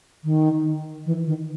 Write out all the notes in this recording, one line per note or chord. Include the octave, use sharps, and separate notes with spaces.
D#3
E3
D#3